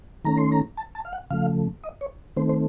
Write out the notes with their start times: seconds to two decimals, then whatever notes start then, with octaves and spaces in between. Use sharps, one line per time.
0.25 D#3 A3 C#4 A#5
0.38 C6
0.52 A#5
0.77 A5
0.95 A5
1.05 F5
1.13 F#5
1.31 C#3 F3 A3 F5
1.84 D#5
2.01 C#5
2.37 D#3 A3 C4 C5
2.49 C5